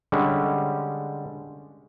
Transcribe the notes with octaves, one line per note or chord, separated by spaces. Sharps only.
D3 G3 G#3 C#4